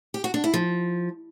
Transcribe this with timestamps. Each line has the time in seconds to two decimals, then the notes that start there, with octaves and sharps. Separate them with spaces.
0.14 G4
0.24 F#4
0.34 D4
0.44 E4
0.54 F3